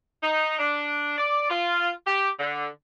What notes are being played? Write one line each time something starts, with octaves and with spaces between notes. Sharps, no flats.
D#4
D4
D5
F4
G4
D3